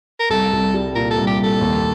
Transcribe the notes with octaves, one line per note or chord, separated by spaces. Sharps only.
A#4
C2 A4
C2
G3
A#2 A#4
A4
C2
G4
C2
A4
D#2